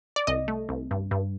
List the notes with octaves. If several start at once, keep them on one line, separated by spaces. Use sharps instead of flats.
D5
C2 D#5
A3
C2
G2
G2